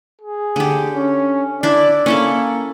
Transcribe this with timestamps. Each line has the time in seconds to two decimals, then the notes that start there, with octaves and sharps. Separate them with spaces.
0.21 G#4
0.56 D3 G4
0.93 C#4
1.63 D4 E4 D5
2.06 A#3 C#4 E4 A4